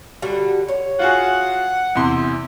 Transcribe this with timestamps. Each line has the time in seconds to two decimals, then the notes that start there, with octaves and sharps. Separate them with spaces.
0.22 D3 G3 F#4
0.68 C#5
0.99 F4 F#4 G#4 F#5
1.95 E2 C3 E4 C6